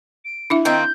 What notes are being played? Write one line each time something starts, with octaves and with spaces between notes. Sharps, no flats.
D7
D4 E4 E5
D#3 A#3 C4 G6